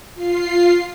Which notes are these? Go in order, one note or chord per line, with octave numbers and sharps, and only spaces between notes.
F4 C7